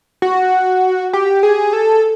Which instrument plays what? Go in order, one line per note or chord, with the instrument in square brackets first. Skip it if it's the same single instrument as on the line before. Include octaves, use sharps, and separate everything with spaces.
[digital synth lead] F#4
G4
G#4
A4